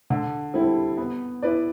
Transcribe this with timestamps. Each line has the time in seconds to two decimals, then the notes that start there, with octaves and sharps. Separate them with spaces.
0.10 D3
0.54 G3 C4 E4 A4
0.97 B3
1.42 E4 B4 D5